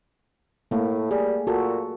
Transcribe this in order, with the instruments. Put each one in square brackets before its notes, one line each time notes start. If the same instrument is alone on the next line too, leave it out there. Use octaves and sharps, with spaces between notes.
[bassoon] A2 [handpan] A3 A#3
[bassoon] G3 [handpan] G#4
[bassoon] A#2 [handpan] F#4 A4